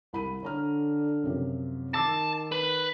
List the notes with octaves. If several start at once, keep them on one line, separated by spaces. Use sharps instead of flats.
C2 B5 D#7
D3 C#5 A#5 F6
F#2 C3 F3
D#3 A5 D6 E6 C7
B4